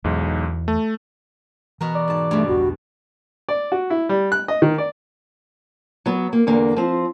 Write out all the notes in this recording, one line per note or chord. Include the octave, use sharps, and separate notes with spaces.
B1 E2 G#2
A3
B2 E3 F#4 A#4
D5
G#2 A5
G2 B2 A3
A#1 E2 F#4
D5
F#4
E4
G3
F#6
D#5
D#3
D5
F#3 B3
A#3
E2 D3 A#3
F3 C4